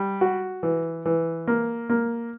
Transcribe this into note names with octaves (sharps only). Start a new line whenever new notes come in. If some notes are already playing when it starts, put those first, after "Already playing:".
Already playing: G3
F#4
E3
E3
A#3
A#3